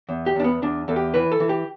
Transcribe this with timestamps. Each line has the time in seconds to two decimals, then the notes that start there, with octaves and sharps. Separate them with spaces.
0.09 E2
0.26 G4
0.35 E2 D4
0.44 B3
0.62 E2 D4
0.88 E2 A4
0.96 G4
1.14 E3 B4
1.32 A4
1.40 E3
1.49 G4